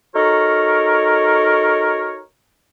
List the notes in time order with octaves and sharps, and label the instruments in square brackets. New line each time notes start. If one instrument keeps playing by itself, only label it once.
[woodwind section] D#4 F#4 A4 A#4 C#5